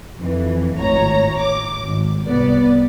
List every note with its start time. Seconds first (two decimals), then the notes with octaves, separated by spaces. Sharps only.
0.18 F2 E3
0.75 G#1 A2 C#5 A#5
1.38 D6
1.83 G#1
2.27 C2 B3 D5